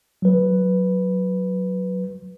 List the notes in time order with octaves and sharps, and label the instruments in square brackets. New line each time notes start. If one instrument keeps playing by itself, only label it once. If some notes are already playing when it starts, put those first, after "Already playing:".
[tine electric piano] F#3 B4